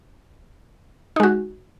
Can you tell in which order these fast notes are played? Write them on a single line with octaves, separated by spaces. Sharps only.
D#4 G#3 F#4